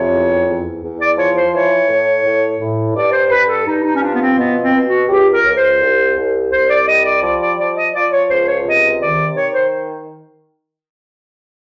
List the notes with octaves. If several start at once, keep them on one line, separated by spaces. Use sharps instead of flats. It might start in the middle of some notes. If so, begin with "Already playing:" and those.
Already playing: F2 C3 C#5
E2
E2
E2
D5
F3 C#5
C5
E3 C#5
A2
A2
A2
G2 D5
C5
G2 B4
A4
G2 D#4
D#4
C#4
F3 D4
B3
C4
B2 B3
C4
B2
F#4
C#2 G4
A#4
C#2
C5
C2
C2
C2 C5
D5
G3 D#5
D5
F3 D5
D5
F3 D5
D#5
F3 D5
C#5
C#2 C5
C#5
C3 D#5
D#3 D5
D#3 C#5
C5